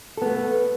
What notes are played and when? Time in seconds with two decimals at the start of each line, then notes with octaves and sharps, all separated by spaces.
0.17 A4
0.22 B3
0.26 A3